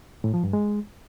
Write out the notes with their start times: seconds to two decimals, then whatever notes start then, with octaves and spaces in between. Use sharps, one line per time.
0.24 A2
0.34 F3
0.44 G2
0.53 G#3